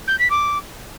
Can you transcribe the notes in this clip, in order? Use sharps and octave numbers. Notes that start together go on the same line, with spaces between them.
G6
B6
D6